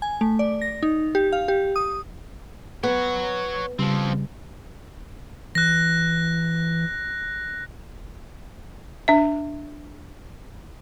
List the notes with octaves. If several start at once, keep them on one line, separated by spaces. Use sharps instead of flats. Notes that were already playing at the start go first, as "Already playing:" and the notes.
G#5
A3
D5
A#6
D#4
G4
F5
G4
D#6
B3 C#5 F#5
C#3 F3 G3 C4
E3 F#6 A#6
D4 E5